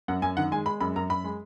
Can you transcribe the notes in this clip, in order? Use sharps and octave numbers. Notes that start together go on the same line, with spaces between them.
F#2 F#5
F#2 G#5
D#3 F#5
G#3 G#5
G#3 B5
F#2 B5
F#2 A#5
F#2 B5
G#3